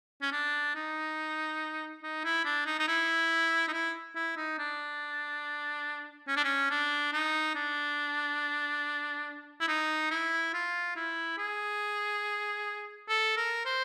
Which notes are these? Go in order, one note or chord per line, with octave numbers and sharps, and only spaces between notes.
C#4
D4
D#4
D#4
E4
D4
D#4
D#4
E4
D#4
E4
E4
D#4
D4
C#4
D4
C#4
D4
D#4
D4
E4
D#4
E4
F4
E4
G#4
A4
A#4
C5